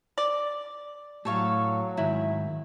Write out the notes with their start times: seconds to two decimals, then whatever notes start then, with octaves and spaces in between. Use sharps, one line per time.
0.18 D5
1.25 A2 F#3 A4 C#5 F5
1.97 G#2 D#3 E4